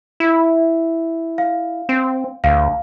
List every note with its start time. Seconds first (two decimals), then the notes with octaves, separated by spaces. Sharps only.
0.20 E4
1.38 F5
1.89 C4
2.44 D2 F5